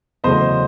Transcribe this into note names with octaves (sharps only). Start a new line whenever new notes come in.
E2 C#3 F#3 A3 C5 D#5